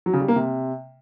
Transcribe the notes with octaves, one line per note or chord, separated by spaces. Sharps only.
F#3
C#3
G3
A#3
C3